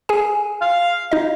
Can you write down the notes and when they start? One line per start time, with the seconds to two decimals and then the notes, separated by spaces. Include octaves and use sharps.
0.09 G#4 G#5
0.61 F5
1.12 D#4 D#5